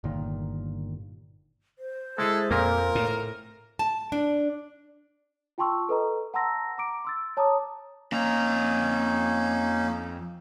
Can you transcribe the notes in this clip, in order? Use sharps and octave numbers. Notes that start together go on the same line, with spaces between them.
G1 A#2 D#3
C5
G#3 E4 G#4 A4
F2 A#2 A#3 A#4
A2
A5
D4
F4 G5 A5 C6 C#6 E6
A4 B4 D#5 A#5
F#5 A5 A#5 C6 E6 A#6
A#5 D6 D7
C6 E6 A6
C#5 A5 A#5 D6 D#6
F2 A#3 C#4 D#4 A#5